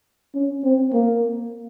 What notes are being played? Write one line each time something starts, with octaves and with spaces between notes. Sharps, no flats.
C#4
C4
A#3